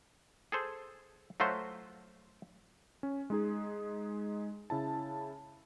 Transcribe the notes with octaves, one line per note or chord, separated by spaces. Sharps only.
G#4 A4 C5
F#3 A3 F4 F#4 C5
C#4
G#3 D#4 G#4
C#3 E4 A5